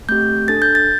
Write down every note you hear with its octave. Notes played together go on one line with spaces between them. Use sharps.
A3 C4 G4 G6
D4 A4 A6
G6
A6